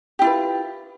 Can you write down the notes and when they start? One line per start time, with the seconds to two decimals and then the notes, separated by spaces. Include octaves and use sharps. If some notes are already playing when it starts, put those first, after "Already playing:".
0.19 G4
0.22 E4
0.24 F4
0.27 B4